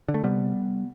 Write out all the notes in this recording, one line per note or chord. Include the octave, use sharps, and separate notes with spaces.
D3
A3
C3 G3 B3